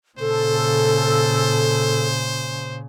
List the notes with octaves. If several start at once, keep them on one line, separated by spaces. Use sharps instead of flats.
A#2 C#3 A4 C5